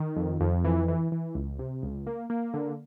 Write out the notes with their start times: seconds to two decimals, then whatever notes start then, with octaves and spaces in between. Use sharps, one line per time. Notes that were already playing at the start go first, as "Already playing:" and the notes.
Already playing: D#3
0.16 F2
0.41 F2
0.65 E3
0.88 E3
1.12 E3
1.35 C#2
1.59 C3
1.83 C#2
2.07 A#3
2.30 A#3
2.54 D3